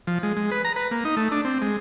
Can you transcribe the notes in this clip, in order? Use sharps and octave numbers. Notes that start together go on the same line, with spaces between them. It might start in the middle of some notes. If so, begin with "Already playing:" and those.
F3
G#3
G#3
B4
A#5
B4
A#3
D#4
A3
D4
C4
G#3